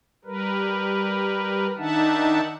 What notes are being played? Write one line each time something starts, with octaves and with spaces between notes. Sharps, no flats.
G3 A#4 B4
D#3 D4 D#4 E5 F#5 A5